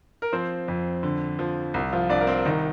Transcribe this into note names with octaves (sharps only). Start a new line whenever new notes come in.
A#4
F3 C4 C5
F2
D3
F3
C2
F3 F4
C2 D4 D5
A#4
C4 C5
C2 D#3 D#4